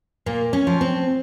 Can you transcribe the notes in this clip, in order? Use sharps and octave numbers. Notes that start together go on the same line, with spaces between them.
A#2 A#3
C#4
F3
C4